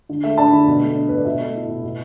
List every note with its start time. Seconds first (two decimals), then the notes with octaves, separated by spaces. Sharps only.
0.09 D3
0.24 A3 E5
0.38 D4 A5
0.48 B5
0.53 D3
0.67 B2
0.81 A3
0.96 D4
1.09 B2 B4
1.18 D5
1.25 B2 E5
1.39 A3
1.55 E4
1.68 B2
1.84 B2